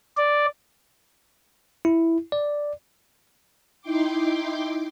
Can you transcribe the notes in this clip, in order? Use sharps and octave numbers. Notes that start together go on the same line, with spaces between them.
D5
E4
D5
D#4 E4 G5 C6 D6